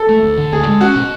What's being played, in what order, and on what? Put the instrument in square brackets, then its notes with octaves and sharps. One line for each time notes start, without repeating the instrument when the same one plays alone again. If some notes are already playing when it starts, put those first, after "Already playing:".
Already playing: [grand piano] A4
[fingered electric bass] A3
D2
D3
[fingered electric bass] D2 [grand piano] G#4
[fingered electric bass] G#3
[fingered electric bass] C#4 [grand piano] F#4
[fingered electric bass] B2